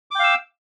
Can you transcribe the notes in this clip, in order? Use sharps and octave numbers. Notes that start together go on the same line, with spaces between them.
F5 G5 D6 E6